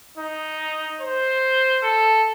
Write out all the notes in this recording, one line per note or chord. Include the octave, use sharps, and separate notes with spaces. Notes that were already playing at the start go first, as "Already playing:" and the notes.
D#4
C5
A4